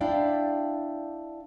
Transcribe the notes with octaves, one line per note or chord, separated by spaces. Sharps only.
D4 E4 D5 F5 G5